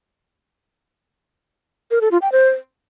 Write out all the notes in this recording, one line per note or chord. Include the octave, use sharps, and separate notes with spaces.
A#4
A4
F4
G5
C5